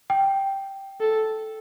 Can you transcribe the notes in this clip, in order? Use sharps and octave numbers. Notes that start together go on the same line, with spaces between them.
G5
A4